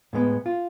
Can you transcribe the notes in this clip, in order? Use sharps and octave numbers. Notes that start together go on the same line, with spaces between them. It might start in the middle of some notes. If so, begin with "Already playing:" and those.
A2 G#3 B3
F4